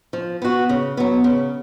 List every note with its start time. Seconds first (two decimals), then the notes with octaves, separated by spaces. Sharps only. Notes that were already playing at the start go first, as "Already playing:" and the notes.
0.13 F3
0.42 B3 F#4
0.69 C#3
0.97 F#3 B3
1.24 C#3